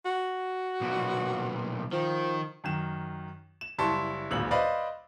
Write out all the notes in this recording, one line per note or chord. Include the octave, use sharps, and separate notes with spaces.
F#4
B1 A#2
D#3 F3
F#2 D#3 E7
E7
F#1 G3 E4 A5 C6 C#6
D1 G#1 A#2 C#3 E6 F#7
B4 C5 D5 D#5 F5